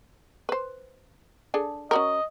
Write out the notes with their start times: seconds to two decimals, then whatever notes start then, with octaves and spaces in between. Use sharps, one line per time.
0.49 B4 C5
1.54 D4 G#4 A4
1.91 C#4 F#4 A#4 D#5